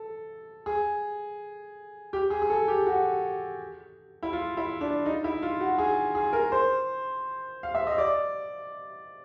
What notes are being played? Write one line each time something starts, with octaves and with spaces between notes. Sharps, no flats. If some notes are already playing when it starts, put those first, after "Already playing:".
Already playing: A4
G#4
G4
G#4
G#4
A4
G4
F#4
E4
F4
E4
D4
D#4
E4
F4
F#4
G#4
G#4
A#4
C5
F5
E5
D#5
D5